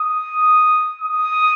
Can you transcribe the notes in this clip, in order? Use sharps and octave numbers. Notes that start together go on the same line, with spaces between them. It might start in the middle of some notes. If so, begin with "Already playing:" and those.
Already playing: D#6
D#6